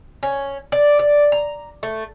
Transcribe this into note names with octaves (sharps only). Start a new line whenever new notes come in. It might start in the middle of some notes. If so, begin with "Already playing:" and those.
C#4
D5
D5
A#5
A3